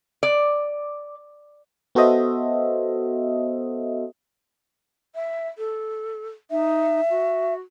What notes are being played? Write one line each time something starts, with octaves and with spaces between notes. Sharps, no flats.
D5
B3 F#4 A4 C5 D#5 E5
E5
A4
D#4 E5
F#4